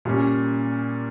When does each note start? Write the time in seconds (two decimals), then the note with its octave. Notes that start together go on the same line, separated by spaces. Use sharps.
0.05 A#2 G3 C#4